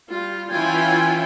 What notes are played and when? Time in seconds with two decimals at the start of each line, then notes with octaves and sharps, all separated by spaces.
0.11 G3 F4
0.51 E3 C#4 E4 F4 G5 G#5